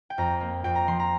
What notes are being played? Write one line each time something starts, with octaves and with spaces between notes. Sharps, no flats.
G5
F2 A#5
A#3
F2 G5
A#5
F3 C6
A#5